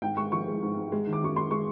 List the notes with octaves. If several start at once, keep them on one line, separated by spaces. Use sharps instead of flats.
G#2 G5
G#3 C#6
F3 C#6
G#3
G#2
G#2
G#3
D#3
D6
F#2 C#6
G#3 C6
G#3 C#6